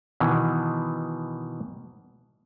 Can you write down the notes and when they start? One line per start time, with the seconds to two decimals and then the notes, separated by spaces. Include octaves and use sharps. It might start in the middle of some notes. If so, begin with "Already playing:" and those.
0.20 B2 D#3 E3